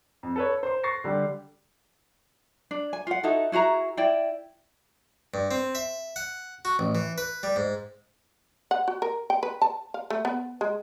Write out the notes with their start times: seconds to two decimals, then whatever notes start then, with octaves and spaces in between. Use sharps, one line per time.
0.23 F2
0.36 A4 B4 C#5
0.63 C5 C6
0.84 C#6 A6 A#6 C7
1.04 D3 G3 G4
2.71 D4
2.93 G#5
3.07 F4 F#5
3.23 D#4 E4 F#4 A4
3.52 E4 F#4 G#4 A#5
3.97 E4 D5 G5
5.34 G2
5.51 C4
5.75 E5
6.16 F#5
6.65 F#4
6.79 A1
6.95 E3
7.18 B4
7.43 G3
7.56 G#2
8.71 F#5
8.88 F#4
9.02 A#4
9.30 G5
9.43 B4
9.62 A5
9.94 F5
10.10 A3
10.25 B3
10.61 G#3